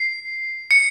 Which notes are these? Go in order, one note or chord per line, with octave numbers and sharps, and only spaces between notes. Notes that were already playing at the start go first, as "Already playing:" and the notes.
Already playing: C7
C#7